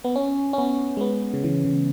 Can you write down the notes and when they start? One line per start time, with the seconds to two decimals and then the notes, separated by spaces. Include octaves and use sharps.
0.04 B3
0.16 C#4
0.53 C#4
0.58 B3
0.97 G#3
1.01 B3
1.34 C#3
1.44 E3
1.65 C#3